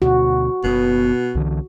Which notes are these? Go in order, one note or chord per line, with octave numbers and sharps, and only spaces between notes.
D2 B2 F#4
F#1 B2 B3
C2 D3 E3